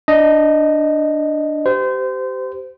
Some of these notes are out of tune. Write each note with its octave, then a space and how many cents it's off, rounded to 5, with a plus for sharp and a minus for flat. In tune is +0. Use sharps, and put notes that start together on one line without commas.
D4 +5 D#5 +0
G4 -20 C5 -30